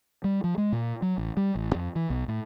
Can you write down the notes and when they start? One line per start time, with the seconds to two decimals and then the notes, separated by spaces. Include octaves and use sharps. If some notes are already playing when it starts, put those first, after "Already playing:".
0.24 G3
0.44 F3
0.58 G#3
0.72 A#2
1.02 F#3
1.18 A1
1.37 G3
1.55 A1
1.75 F2
1.96 E3
2.10 B1
2.28 A2